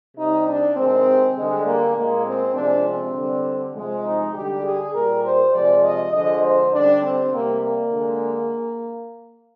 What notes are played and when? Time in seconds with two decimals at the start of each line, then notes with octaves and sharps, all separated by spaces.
0.15 C3 G3 D#4
0.46 D4
0.75 C3 D#3 G#3 C4
1.35 D3 G3 G#3
1.65 A#3
1.94 A#2 G#3 A#3
2.24 C4
2.54 C3 F3 G#3 D4
2.85 C4
3.14 D3 G3
3.73 C3 F3 G#3
4.04 D#4
4.33 D3 G3 G4
4.63 G#4
4.92 A#2 G3 A#4
5.22 C5
5.52 C3 F3 G#3 D5
5.83 D#5
6.12 D3 F3 G#3 D#5
6.41 C5
6.71 D3 G3 D4
7.01 C4
7.31 C3 G3 A#3
7.61 A#3
7.90 D3 G#3